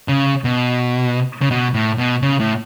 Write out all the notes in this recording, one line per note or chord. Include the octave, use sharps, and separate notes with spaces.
C#3
B2
C#3
B2
A2
B2
C#3
A2